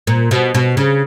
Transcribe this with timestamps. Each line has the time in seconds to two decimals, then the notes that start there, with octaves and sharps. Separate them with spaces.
0.07 A#2
0.31 B2
0.54 B2
0.77 C#3